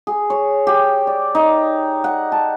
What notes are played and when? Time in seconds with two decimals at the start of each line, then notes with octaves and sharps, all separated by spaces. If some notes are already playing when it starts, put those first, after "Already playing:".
0.07 G#4
0.30 C#5
0.67 G4
1.07 D5
1.35 D#4
2.04 F#5
2.32 A5